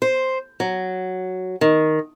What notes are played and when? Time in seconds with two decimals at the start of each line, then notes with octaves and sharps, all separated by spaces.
0.02 C5
0.60 F#3
1.61 D#3